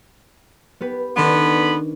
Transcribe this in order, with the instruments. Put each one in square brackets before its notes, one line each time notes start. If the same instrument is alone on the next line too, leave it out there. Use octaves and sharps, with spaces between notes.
[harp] B3 G4 B4
[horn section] D3 B3 B5 [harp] D#3 C#4 D4